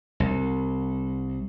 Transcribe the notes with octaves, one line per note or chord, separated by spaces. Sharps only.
C2